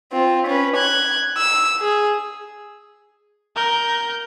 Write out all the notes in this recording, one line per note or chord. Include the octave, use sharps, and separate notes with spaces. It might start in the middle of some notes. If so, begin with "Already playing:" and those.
C4 F4
C#4 B4
F#6 G#6
E6
G#4
A#4 G6